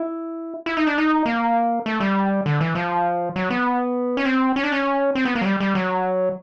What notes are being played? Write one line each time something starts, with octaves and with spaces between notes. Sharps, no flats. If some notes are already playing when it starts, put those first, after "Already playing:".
Already playing: E4
E4
D#4
D4
D#4
A#3
A3
G3
D3
E3
F3
F#3
B3
C#4
C4
C#4
D4
C#4
C4
B3
A#3
F#3
G3
G3
F#3